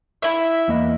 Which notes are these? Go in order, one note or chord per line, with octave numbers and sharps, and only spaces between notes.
E4 E5
E2 A#3 D#5